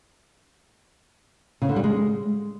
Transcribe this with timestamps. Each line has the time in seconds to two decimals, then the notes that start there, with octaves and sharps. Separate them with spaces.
1.62 C#3
1.69 D3
1.76 G3
1.84 G#3